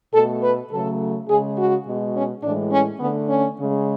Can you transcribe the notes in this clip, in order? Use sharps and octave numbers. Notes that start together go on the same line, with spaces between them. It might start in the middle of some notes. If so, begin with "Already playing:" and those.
B2 A3 A4
B4
C#3 F#3 A3 A4
C#3 G#3 G#4
F#4
B2 G#3
C#4
A2 E3 G#3 D4
C#4
D3 A3 B3
C#4
C#3 G#3